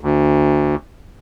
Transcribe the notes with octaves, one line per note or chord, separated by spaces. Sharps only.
D2